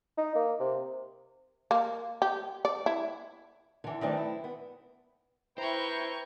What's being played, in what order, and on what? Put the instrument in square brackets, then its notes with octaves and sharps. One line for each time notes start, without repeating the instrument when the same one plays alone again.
[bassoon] D#4
A#3
C3
[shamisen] A#3
G4
D5
E4
[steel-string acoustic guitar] D3 E3
D#3 E3 F#3 A3 C4 D4
E4
B3
[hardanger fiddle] E4 G5 [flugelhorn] B4 [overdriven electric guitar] C5 [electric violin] A#5 C#6